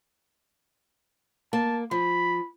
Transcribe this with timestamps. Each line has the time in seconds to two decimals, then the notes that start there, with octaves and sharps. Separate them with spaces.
1.53 A#3 A5
1.91 F3 B5